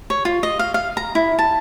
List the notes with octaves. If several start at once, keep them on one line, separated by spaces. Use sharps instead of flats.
C#5
F4
D#5
F5
F5
A#5
E4
A5